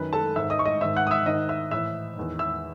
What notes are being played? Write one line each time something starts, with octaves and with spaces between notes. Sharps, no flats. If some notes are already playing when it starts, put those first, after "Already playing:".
Already playing: F#2 D#3 B4
A4 A5
G#2 D#3 E5 E6
D#5 D#6
C#6
D#5 D#6
G#2 D#3 E5 E6
F#5 F#6
D#6
E5 E6
G#2 D#3 D#5 D#6
E5 E6
A2 E3 E5 E6
E2 D#3
E5 E6